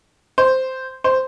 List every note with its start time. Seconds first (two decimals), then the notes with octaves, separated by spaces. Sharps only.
0.38 C5
1.04 C5